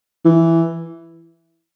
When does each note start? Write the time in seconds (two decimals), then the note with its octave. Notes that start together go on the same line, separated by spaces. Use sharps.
0.25 E3